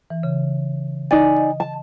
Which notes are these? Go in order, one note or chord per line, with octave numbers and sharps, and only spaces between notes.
E3
C#3
D#4 D5 G#5 A6
D#5
A5